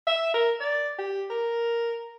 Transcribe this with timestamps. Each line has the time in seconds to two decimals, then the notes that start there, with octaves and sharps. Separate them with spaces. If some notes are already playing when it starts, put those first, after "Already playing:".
0.07 E5
0.34 A#4
0.60 D5
0.99 G4
1.30 A#4